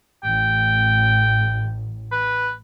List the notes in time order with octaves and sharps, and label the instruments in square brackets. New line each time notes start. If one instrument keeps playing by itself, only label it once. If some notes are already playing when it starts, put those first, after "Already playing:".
[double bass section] A1 [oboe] G5
[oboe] B4